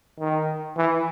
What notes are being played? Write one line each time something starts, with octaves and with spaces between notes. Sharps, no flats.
D#3
E3